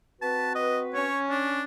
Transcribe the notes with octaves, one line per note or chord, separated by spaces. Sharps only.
C4 F#4 B4 A5
D#5
C#4 C#5
D4